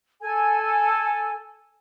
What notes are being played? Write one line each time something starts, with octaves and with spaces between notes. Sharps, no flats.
A4 G#5